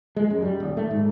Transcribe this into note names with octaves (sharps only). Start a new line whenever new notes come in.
G#3
F#2
G3
D#1
A3
G#2